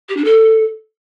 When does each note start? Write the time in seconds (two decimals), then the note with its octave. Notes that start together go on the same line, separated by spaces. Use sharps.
0.09 G4
0.17 D4
0.24 A4